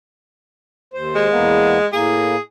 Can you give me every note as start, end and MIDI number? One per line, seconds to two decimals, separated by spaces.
0.94 1.28 39
0.94 1.28 72
1.15 1.87 56
1.30 1.78 40
1.30 1.78 58
1.30 1.78 59
1.93 2.35 45
1.93 2.35 58
1.93 2.40 68